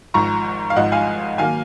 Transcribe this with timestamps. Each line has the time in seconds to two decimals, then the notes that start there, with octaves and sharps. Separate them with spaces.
0.14 G#1 G#2 F3 A#5 C#6
0.70 F5
0.76 G#1 G#2 F3 D#5 F#5
0.92 F5 G#5
1.38 D#3 F#3 A#3 F5 G#5